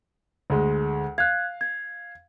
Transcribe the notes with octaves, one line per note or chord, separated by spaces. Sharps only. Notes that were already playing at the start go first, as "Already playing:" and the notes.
D2 G#3
F5 F#6 G#6
G#6